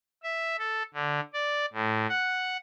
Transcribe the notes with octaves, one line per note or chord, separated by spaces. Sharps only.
E5
A4
D3
D5
A2
F#5